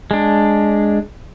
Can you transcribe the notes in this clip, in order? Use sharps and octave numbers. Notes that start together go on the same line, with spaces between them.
G#3 D4